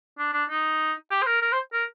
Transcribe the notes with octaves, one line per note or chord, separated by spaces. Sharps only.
D4
D4
D#4
G4
C5
A#4
A#4
C5
A#4